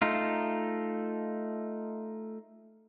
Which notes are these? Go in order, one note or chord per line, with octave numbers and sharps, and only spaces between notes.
A3 D#4 F4